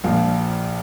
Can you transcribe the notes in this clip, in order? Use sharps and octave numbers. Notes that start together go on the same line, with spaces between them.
A#1 A#2 F3 F5